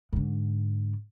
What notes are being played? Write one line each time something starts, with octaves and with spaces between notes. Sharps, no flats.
G#2 D3